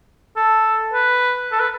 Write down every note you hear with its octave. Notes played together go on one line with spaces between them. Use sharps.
A4
B4
A4
B4